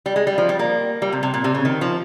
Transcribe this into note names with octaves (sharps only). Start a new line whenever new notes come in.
G3
G#3
G3
F3
G3
A#3
G3
C3
C3
A#2
C3
C#3
D#3
F3